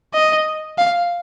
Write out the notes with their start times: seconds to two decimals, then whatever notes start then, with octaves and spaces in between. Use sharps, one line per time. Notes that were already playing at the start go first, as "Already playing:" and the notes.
0.14 D#5
0.79 F5